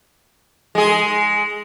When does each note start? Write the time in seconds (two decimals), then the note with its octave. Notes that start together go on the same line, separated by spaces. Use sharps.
0.75 G#3 G#4